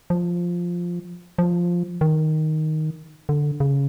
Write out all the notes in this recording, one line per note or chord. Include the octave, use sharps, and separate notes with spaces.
F3
F3
D#3
D3
C#3